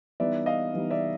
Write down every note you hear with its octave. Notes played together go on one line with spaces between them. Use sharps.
E3 G3 B3 D#4 D5 E5
D#5 F5
E3 G3 B3 D#4
D5 E5